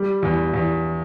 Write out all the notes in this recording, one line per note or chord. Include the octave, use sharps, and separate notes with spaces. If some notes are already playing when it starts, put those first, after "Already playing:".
Already playing: G3
E2
E2